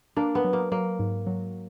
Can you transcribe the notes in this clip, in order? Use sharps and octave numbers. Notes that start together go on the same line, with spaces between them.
A#3 D4
B3
F#3
A#3
F#3 A#3
G#2
F#3